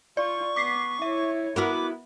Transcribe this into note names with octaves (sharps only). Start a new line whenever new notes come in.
F4 D5 C#6
B3 D6 B6 C7
E4 C#5 E5
B3 E4 F#4 A#4 D6